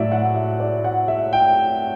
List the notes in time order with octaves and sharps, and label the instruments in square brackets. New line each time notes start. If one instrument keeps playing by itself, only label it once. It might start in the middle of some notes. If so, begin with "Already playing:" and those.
Already playing: [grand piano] A2 F#3 D5 E5
F#5
E5
D5
F#5
E5
G5